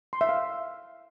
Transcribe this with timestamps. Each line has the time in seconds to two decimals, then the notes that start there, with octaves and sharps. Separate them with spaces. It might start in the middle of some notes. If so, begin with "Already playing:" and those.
0.13 C6
0.21 E5
0.29 F5